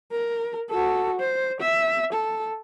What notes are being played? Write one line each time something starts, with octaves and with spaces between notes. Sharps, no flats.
A#4
F#4 A4
C5
E5
A4